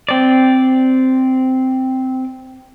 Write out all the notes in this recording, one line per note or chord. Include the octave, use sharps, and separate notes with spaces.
C4 D5